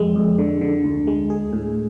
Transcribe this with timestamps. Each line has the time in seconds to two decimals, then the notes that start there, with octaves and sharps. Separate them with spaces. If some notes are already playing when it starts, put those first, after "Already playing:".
Already playing: F2 G#3
0.16 F2
0.38 D3
0.61 D3
0.84 D2
1.07 G#3
1.30 G#4
1.53 A2